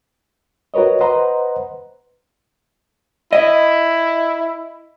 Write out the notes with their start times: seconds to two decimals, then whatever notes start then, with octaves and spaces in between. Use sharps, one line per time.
0.74 F#4 A#4 B4 C#5 D#5
1.01 B4 C5 D#5 F#5 A#5 C6
3.33 E4 D#5